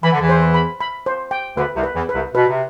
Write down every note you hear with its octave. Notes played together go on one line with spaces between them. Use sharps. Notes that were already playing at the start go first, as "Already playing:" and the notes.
E3 B5
D3
E2 E3
C5
B5
B5
C5
G5
D2 D3 B4
C2 C3
B4
E2 E3
B4
C2 C3
B2 B4
C3